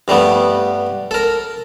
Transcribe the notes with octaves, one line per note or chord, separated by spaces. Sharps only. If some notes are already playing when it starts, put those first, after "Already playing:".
G2 G3 A3 B3
A4 A#4